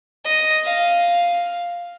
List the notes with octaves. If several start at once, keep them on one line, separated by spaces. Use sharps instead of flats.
D#5
F5